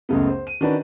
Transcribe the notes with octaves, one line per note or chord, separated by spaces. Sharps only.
C#2 F#2 C#3 A3 B3
C5
D#7
D#3 C#4 D4 F#4 B4